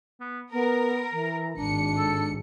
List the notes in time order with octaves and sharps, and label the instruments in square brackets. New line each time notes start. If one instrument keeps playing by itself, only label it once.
[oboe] B3
[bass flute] B3 [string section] A#4 [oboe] A#5
[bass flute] E3
[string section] G#1 C#7 [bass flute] D4
[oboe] A4